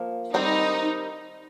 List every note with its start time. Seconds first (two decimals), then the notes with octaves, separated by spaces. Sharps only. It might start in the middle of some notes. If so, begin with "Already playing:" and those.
Already playing: F3 A#3
0.34 D#3 G3 C4 D#4